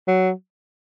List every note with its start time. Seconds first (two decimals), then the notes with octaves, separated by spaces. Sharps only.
0.08 F#3